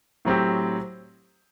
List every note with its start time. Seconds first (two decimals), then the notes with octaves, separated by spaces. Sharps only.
0.25 A2 F#3 C4 G4